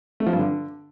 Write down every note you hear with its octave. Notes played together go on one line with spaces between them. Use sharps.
A3
F3
G2
D3